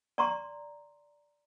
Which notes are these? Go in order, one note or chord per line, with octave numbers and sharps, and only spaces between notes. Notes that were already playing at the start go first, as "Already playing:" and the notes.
D5 A#5 C6